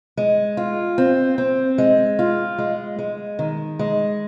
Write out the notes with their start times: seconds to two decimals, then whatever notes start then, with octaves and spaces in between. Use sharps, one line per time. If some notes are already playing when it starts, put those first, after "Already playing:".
0.17 G#3
0.57 F4
0.98 C4
1.38 C4
1.78 G#3
2.19 F4
2.58 G#3
2.99 G#3
3.39 D#3
3.79 G#3